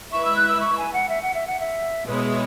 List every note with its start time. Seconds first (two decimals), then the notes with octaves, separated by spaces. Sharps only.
0.12 G#3 E4 B4 E5 C#6
0.25 E6
0.36 F#6
0.49 E6
0.60 C#6
0.78 G#5
0.93 F#5
1.09 E5
1.23 F#5
1.34 E5
1.47 F#5
1.60 E5
2.06 B2 G#3 B3 E4 B4 C#5
2.23 G#4